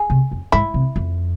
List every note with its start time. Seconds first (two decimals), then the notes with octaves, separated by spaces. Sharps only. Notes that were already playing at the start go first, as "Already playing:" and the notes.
Already playing: G#4
0.10 C3
0.31 F2
0.52 G#2 E4
0.74 C3
0.96 F2